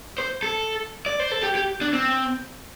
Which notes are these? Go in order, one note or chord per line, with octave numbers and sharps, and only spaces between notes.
C5
A4
D5
C5
A4
G4
G4
D4
C4